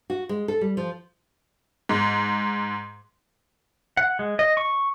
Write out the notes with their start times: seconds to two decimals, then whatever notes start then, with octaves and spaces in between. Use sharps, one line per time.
0.10 F#4
0.29 G#3
0.48 A4
0.61 G3
0.77 F3
1.89 G#2
3.97 F#5
4.19 G#3
4.39 D#5
4.57 C#6